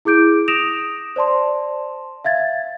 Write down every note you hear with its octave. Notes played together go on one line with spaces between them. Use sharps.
E4 G#4 D6 G6 D7
D#6 A#6 D7 E7 F7
C5 D5 A5 C6
E5 F5 G#6 A6